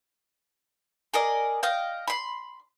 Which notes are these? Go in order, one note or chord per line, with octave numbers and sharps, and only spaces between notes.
G#4 A#4 D5 D#5
D#5 F5 G5
B5 C6